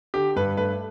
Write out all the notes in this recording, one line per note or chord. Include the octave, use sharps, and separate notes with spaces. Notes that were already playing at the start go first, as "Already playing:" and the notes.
D3 G4
G2 B4
A3 B4